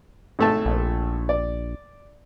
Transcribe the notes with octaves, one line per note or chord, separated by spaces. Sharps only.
G#1 A3 A5
A#1
D5